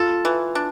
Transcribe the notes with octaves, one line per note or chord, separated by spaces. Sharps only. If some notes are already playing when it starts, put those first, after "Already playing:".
Already playing: F4 A4
E3
D4